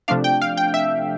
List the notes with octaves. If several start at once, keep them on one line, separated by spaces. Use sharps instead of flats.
C3 F3 A3 D4 F5
G5
F5
G5
E5